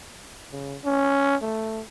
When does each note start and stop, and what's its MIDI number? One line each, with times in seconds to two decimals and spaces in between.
0.52 0.77 49
0.84 1.36 61
1.42 1.81 57